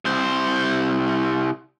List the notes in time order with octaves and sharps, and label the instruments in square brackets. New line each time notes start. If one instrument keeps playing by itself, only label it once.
[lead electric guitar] C2 C5